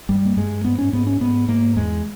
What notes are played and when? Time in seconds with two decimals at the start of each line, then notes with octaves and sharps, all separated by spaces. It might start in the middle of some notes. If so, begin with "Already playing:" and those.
0.09 G2 G3
0.25 A#3
0.37 G2 G#3
0.65 G#2 B3
0.78 C#4
0.93 G#2 B3
1.07 C#4
1.20 G#2 B3
1.48 G#2 A#3
1.76 E2 G#3